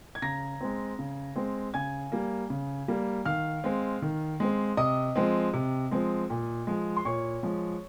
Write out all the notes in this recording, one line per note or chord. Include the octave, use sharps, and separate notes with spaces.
G#6
C#3 A#5 A#6
G#3 C4
C#3
G#3 C4
C#3 G#5 G#6
G3 A#3
C#3
G3 A#3
D#3 F5 F6
G#3 C4
D#3
G#3 C4
C3 D#5 D#6
F3 G#3 C4
C3
F3 G#3 C4
A#2
F3 G#3
C6
A#2 C#5 C#6
F3 G#3